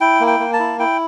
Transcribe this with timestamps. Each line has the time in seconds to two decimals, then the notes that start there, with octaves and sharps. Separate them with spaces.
0.01 E4 G5
0.20 A#3
0.27 G5
0.40 A#3
0.53 A5
0.59 E4
0.79 E4 G5